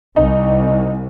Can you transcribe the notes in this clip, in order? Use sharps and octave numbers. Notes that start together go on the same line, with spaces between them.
C2 D#4